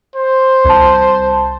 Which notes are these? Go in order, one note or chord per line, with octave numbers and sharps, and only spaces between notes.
C5
C2 A5